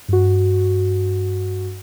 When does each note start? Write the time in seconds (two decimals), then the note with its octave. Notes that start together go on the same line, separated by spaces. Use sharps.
0.09 G2 F#4